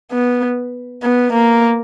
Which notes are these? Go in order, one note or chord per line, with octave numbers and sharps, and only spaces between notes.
B3
B3
A#3